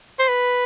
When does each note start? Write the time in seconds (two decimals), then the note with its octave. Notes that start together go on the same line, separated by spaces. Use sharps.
0.19 C5
0.29 B4